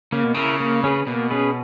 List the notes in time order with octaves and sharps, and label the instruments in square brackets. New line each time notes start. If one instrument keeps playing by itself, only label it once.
[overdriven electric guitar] C#3 [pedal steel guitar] A#3
[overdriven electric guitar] B2
[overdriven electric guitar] C#3 [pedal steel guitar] E4 A#4
[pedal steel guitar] A#3
C#4 G#4 B4
[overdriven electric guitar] B2 [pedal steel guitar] A#3
[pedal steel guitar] C#4 G#4 B4